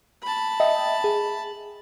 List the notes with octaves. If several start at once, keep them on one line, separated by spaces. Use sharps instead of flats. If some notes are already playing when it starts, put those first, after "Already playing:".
A5 B5
D#5 E5 G5
G#4